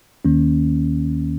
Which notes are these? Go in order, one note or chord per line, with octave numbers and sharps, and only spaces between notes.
D#2 D#3 A#3 C#4